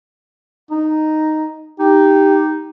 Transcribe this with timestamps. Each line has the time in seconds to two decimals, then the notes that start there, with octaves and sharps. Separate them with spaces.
0.71 D#4
1.79 D#4 G4